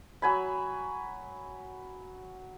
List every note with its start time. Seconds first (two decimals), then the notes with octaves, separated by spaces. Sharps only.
0.22 F#3 G#5 B5